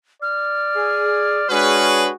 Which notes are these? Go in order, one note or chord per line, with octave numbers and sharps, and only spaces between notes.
D5 F6
G#4
G#3 D4 F#4 G#4 B4 C#5